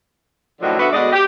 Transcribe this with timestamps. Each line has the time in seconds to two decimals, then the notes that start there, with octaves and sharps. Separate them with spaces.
0.62 F#2 A2 D3 D#3 F3 F#3
0.79 B2 D3 B3 F#4 A4 E5
0.93 D2 B2 G#3 D5 D#5
1.13 G4